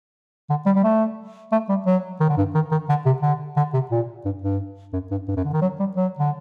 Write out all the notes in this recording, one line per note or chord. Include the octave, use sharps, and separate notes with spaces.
D3
G3
G3
A3
A3
G3
F#3
D#3
D3
G2
D#3
D#3
D3
C3
D3
D3
C3
A#2
G2
G2
F#2
G2
G2
F#2
D3
D#3
F#3
G3
F#3
D3